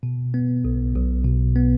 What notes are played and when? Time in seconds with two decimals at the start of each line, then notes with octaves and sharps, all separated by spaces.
0.03 B2
0.34 B3
0.65 B1
0.95 B1
1.24 B2
1.56 B3